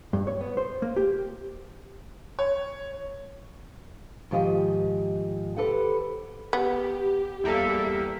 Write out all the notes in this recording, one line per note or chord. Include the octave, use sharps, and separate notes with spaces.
G2
C#5
B3
C5
A#3
G4
C#5
G#2 D#3 F3 G4 D#5
G4 A4 B4 C5 F#5
B3 G4
E2 G3 A#3 A4 E5